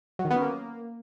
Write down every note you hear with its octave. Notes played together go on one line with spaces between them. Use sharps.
F#3
D#3
B3
C#4
A#3